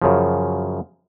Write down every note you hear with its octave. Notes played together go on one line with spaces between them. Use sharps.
F#2 C#3 F3